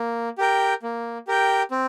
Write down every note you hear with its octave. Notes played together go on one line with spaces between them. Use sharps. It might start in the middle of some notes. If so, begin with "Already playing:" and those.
Already playing: A#3
G4 A#4 G5
A#3
G4 A#4 G5
C4